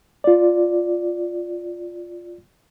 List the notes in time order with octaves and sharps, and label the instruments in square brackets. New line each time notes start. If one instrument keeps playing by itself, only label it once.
[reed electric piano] F4 D5